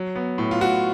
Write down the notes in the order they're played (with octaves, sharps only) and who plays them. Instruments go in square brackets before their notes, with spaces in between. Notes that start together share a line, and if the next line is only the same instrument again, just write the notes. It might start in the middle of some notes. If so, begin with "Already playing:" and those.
Already playing: [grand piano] F#3
B3
A2
F4
A2 F#4